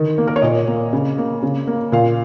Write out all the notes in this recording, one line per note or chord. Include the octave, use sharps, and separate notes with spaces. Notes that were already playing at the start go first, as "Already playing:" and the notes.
Already playing: D#3
A#3
A#4
C#5
A#2 D#5
A#3
C#3
A#3
C#3
A#3
A#2 F5